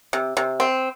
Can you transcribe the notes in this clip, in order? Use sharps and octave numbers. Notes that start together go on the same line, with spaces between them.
C3
C3
C4